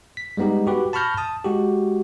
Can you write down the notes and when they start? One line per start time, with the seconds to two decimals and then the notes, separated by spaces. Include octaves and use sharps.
0.17 B6
0.37 G3 G#3 B3 D#4 G4
0.67 F#4 G4 B4
0.93 A5 B5 C#6 F6 G6 A#6
1.17 A5 D#6
1.44 G#3 F#4 G4